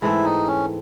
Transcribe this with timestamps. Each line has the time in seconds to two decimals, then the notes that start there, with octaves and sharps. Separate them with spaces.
0.02 G#2 E3 A3 C4 E4
0.24 D#4
0.47 C#4